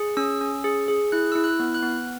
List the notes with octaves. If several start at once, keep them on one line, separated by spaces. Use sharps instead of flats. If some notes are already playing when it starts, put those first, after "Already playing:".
Already playing: G#4
C#4 E6
C#4
G#4
G#4
E4 F#6
E4 E6
F#6
B3
F#6
B3